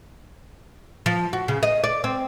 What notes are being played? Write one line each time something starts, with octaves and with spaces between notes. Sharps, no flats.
F3
F#4
C#3
D#5
D5
C4